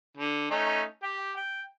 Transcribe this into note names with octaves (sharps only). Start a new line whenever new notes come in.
D3
A3 C#4 D#4
G4 G5
G5